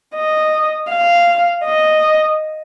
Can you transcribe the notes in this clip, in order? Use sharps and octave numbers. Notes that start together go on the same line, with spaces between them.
D#5
F5
D#5